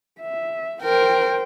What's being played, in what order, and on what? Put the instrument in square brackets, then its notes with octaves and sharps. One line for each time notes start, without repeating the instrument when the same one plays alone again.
[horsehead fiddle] E5
[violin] A#4 [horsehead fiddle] C5 G5